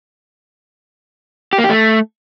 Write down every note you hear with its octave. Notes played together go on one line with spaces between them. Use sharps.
G4
A#3
G4
A3